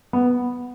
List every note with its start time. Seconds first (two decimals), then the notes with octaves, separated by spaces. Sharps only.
0.13 B3